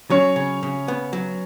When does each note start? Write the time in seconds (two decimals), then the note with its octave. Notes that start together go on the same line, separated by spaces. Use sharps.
0.10 F#3 C#4 C#5
0.36 C#3
0.63 C#3
0.88 B3
1.13 F#3